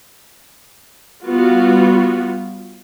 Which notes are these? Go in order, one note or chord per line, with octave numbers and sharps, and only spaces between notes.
G3 B3 F4 F#4